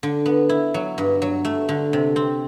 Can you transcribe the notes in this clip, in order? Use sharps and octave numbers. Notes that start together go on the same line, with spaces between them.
D3
B3
E4
F#3
G2
F#3
A3
D3
C3
C4